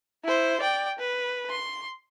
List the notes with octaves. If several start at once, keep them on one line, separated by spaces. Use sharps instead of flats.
E4 C5
D5 G5
B4
C6